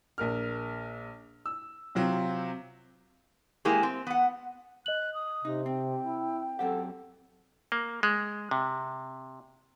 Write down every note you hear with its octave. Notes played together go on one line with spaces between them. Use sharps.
A#1 A#4 F6
E6
C3 F#3 C4 F4
G#3 A#3 E4 G4 G#4
C4
B3 F#5
D#5 F#6 F#7
D#6
C3 D#4
C4 G5
E4
F#2 C4 G4 A4 F#5
A#3
G#3
C3